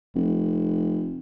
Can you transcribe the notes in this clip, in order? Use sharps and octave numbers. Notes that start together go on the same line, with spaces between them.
F1